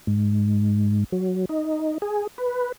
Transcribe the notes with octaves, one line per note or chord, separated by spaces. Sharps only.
G#2
F#3
D#4
G#4
B4